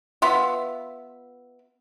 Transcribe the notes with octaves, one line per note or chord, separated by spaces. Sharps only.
B3 F4 E5